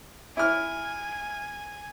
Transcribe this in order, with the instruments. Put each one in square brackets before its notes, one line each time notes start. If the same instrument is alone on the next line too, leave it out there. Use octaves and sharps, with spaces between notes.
[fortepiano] E4 F6 [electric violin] G#5